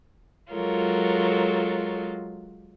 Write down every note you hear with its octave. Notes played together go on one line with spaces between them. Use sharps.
F#3 G#3 F4 A4 A#4 C#5